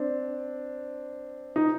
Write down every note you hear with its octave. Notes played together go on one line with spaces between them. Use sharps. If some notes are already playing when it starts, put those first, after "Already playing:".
Already playing: C4 D4
D#4